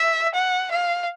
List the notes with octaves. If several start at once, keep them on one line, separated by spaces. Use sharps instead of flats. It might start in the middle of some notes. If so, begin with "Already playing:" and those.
Already playing: E5
F#5
F5